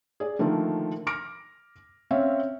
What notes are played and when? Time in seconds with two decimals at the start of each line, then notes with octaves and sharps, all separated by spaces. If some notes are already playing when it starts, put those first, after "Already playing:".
0.20 G#4 D5
0.39 D3 D#3 F3 A3 A#3
1.07 D6 F6 A#6 D7
2.11 C4 C#4 C#5 E5 F5